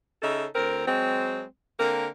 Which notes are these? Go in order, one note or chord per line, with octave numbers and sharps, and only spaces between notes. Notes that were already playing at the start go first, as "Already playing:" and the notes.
C#3 D#4 A4 E5
D2 C4 A#4
F#3 G#3 C4
D3 A#3 C4 A#4